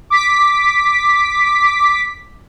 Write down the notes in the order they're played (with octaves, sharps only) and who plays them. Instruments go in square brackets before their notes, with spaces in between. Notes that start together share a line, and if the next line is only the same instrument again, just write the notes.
[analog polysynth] D6 B6